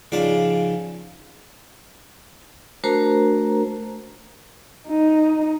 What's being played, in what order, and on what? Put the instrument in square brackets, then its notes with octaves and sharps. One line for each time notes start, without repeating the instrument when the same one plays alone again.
[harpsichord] G#2 C#3 F3 D5
[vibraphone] A3 D4 F#4 A#4 C5 A#5
[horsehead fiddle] D#4